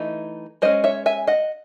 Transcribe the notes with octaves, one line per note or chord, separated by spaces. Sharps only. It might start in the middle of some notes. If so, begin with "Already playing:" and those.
Already playing: E3 A3 D#4
G#3 C#4 C5 D#5
C#5 E5
E5 G#5
D#5 F#5